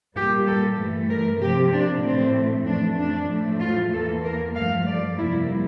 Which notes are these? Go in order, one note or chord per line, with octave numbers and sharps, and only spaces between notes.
A#2 G3 A#3 G4
A4
G2 E3 A3
A#4
C3 F3 A#3 G4
D4
A2 E3 A3 C4
F2 E3 A3 D4
D4
A2 F3 A3
F4
E2 E3 A#3 A4
A#4
G2 F3 A3 F5
D5
F2 C3 G3 A#3 E4